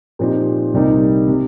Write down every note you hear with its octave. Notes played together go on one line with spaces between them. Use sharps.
A#2 F3 C4 D#4 G4
C2 C3 G3 A#3 D#4
C3 G3